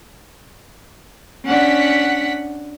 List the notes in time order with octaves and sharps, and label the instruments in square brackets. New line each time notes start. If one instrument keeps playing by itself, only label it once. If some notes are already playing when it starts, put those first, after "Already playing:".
[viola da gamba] C#4 D4 [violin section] F#5 B6